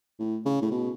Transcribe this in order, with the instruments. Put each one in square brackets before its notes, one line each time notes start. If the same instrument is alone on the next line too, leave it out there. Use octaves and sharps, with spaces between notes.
[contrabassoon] A2
C#3
A2
B2